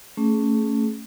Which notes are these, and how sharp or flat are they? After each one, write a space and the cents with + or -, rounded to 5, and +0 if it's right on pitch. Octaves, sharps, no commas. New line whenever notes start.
A3 +20 C#4 +0 G#4 +30